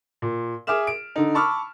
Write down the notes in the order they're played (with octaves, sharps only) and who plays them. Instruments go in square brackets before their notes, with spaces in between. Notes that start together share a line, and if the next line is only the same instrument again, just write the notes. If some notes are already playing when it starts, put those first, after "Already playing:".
[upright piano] A#2
G#4 E5 D6 F6 E7
D7
D3 D#4
A5 B5 C#6 D6 E6 F6